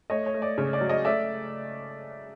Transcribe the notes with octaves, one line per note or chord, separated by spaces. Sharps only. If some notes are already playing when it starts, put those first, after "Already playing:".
A3 C#5 D#5
C#5
A3
D5
C#3 C#5
D5
F#3
C#5 D#5
A3 D5 E5